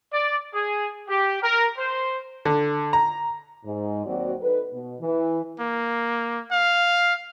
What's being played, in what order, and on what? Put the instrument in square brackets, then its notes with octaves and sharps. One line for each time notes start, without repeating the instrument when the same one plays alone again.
[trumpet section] D5
G#4
G4
A#4
C5
[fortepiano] D3
A#5
[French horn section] G#2
D#2 F#3 C4 F#4 D5
D#4 A4 B4
B2
E3
[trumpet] A#3
F5